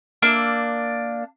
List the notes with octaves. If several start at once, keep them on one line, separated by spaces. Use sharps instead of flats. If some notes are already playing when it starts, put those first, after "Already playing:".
A#3 D4 E6